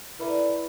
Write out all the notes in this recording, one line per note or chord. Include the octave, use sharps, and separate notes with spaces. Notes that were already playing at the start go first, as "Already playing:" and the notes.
D3 E4 B4 E5 B5